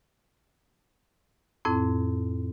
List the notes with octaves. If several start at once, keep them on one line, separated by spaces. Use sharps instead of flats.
F2 A2 C4 E4